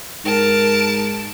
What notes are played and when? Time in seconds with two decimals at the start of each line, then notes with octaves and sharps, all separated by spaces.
0.25 G#2 A#4 A5 D7